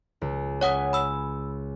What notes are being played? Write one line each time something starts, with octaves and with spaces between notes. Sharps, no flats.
C#2
C#4 C#5 F#5 G#5 D#6
B5 E6